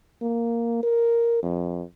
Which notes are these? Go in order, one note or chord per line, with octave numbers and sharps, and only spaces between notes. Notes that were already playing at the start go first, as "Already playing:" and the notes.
A#3
A#4
F2